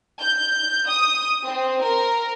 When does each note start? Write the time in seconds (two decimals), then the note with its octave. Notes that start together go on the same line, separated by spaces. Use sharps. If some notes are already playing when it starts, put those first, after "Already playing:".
0.22 G6
0.87 D#6
1.45 C4
1.82 A#4